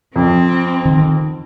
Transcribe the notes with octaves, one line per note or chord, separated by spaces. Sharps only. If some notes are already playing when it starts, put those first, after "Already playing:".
F2 C4
D#3